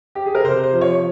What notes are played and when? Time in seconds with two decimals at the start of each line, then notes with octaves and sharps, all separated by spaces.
0.15 G4
0.26 G#4
0.35 A#4
0.44 C3 C5
0.63 C5
0.73 F3
0.81 C#5